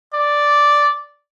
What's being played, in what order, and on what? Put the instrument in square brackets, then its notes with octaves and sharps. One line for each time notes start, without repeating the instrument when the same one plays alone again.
[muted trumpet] D5